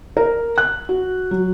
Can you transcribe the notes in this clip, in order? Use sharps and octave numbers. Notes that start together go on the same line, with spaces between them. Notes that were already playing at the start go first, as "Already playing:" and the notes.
A#4
F#6
F#4
F#3